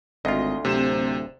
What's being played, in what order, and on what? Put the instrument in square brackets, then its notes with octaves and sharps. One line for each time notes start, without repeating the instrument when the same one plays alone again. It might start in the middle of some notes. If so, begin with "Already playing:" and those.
[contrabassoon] G#1 [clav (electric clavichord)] D2 F4 [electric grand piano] D#5
[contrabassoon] D1 [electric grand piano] C3 C5 E7